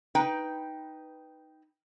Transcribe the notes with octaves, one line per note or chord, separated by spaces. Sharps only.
D#4 B4 G5